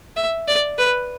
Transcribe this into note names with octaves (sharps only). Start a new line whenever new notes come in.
E5
D5
B4